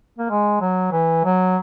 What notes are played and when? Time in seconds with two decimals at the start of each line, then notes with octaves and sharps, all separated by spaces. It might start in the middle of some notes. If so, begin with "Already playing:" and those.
0.19 A#3
0.30 G#3
0.61 F#3
0.92 E3
1.25 F#3